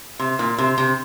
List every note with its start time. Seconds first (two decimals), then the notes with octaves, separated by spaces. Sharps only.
0.19 C3
0.39 A#2
0.58 C3
0.78 C3